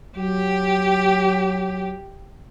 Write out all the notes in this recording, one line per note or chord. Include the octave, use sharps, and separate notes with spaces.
F#3 G4